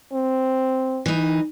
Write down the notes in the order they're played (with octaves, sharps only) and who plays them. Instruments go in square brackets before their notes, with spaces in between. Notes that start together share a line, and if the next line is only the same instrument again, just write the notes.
[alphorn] C4
[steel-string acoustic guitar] E3 D#4